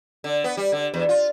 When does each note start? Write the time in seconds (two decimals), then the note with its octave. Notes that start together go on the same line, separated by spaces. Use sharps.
0.24 D3
0.44 B3
0.57 G3
0.72 D3
0.94 E2
1.09 F4